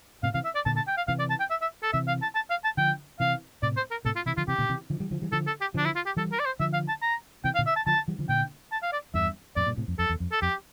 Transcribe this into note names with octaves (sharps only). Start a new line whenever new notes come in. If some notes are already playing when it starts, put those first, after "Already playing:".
A2 C3 F5
C3 E3 F5
E5
D5
A#2 D3 A5
A5
G5
F5
C3 E3 F5
D5
A5
G5
E5
E5
A4
C3 E3 E5
F5
A5
A5
F5
A5
D3 F3 G5
C3 E3 F5
A2 C3 D5
C5
A#4
A2 C3 A4
F4
C3 E3 E4
D3 F3 F4
C3 E3 G4
A#2 D3
C3 E3
D3 F3
E3 G3
D3 F3
E3 G3
D3 F3 A4
A4
G4
D3 F3 D4
E4
F4
G4
E3 G3 A4
A#4
D5
C5
D3 F3 E5
F5
A5
A#5
C3 E3 G5
F5
A#2 D3
E5
A5
D3 F3 A5
E3 G3
D3 F3
A#2 D3 G5
A5
F5
D5
E2 G2 E5
F2 A2 D5
G2 A#2
A2 C3
F2
F2 A4
E2
F2
A4
F2 G4